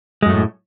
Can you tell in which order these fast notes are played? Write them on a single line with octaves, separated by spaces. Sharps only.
G#3 F#2 A3 A2